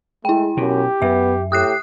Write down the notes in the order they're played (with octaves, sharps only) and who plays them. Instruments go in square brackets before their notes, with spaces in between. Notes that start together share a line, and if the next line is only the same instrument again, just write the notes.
[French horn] G#3 [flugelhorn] A3 [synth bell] E4 G5
[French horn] F#2 [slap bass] B2 [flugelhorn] G4
[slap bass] F#2 [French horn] B3 [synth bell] E5
[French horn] A2 [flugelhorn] G4 [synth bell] D#6 F#6 C7